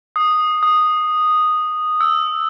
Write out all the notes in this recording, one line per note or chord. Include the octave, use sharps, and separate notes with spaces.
D#6
D#6
E6